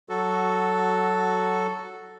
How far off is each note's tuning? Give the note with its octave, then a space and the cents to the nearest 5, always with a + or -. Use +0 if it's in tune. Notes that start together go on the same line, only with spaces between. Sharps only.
F#3 +10 F#4 +0 A4 +0